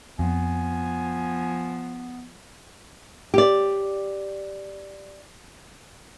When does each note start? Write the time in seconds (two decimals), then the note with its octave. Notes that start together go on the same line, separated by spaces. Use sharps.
0.19 F2 F3 B3 G#5
3.34 G4 D5